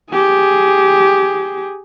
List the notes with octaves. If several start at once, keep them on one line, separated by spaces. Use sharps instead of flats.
G4 G#4